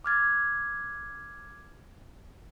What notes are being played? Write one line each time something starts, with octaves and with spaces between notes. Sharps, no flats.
D6 F6 G#6 A6